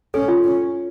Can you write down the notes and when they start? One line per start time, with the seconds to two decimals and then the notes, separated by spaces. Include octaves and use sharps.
0.14 C#4 A4
0.28 F4
0.44 C#4